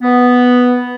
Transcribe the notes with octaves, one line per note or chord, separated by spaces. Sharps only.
B3